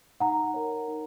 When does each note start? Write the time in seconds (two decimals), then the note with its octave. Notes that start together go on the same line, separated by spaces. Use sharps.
0.20 D#4 F#5 A#5
0.54 A#4 C#5
0.88 D#4